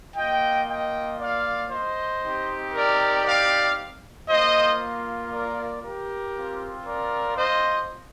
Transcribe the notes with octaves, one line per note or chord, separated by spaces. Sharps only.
A#3 F4 D#5 G5
D#5 G5
D5 F5
C5 D#5
C4 D#4 G4
A#4 D5
D5 F5
A#3 F4 C5 D#5
A#4 D5
G4 A#4
C4 F4
A#4 D5
C5 D#5